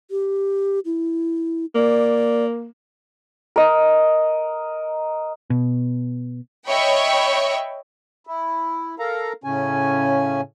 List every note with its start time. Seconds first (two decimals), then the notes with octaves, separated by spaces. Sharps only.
0.11 G4
0.85 E4
1.75 A#3 D5
3.56 A#4 D#5
5.50 B2
6.68 C#5 D#5 E5 G5 B5 C#6
8.27 E4
8.99 A4 A#4 F5 A#5
9.44 A2 C#3 C#4 G#5